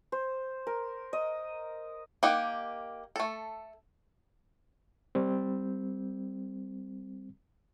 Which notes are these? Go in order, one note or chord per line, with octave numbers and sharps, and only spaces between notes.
C5
A#4
D#5
A#3 D#4 G4 F#5
A3 A4
G3 C4